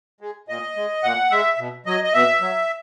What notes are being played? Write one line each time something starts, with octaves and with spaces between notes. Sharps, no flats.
G#3
A#2 D#5
G#3
A#2 F#5
G#3 E5
B2
F#3 D#5
D#5
B2 E5
F#3